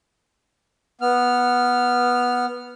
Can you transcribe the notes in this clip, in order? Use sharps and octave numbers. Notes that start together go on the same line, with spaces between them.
B3 F6